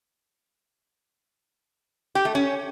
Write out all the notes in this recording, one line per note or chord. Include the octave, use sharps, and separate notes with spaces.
G4
A3
C#4